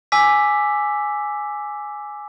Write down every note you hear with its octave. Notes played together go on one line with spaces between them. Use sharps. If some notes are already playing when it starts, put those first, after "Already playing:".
G#5 D6 E6 B6